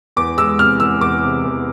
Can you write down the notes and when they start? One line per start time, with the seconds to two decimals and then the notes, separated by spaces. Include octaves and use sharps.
0.16 E2 D6
0.38 G#3 E6
0.59 C3 F6
0.80 E2 E6
1.01 E2 D6
1.23 C3
1.44 E2